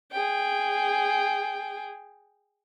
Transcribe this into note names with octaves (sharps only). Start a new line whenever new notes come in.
G#4 G5